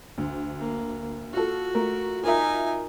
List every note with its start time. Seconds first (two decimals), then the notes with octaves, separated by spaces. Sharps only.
0.18 D2
0.59 A#3
1.33 F4 F#4 A4
1.75 A3 F4 A#4
2.23 D#4 F4 A#4 E5 G#5